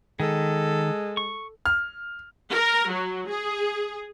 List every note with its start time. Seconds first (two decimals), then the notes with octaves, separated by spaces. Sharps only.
0.20 D#3 G#3 A4
1.17 C#6
1.66 F6
2.51 A#4
2.90 F#3
3.28 G#4